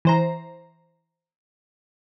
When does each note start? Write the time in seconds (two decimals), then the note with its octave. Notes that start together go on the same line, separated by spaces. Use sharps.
0.05 E3 C5 A#5